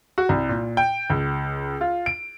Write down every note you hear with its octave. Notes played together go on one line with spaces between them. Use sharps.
F#4
C2
A#2
G5
C#2
F4
D7